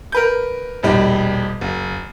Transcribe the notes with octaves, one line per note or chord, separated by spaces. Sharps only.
A#4 B4 G6
E1 A#1 G3 D#4
F#1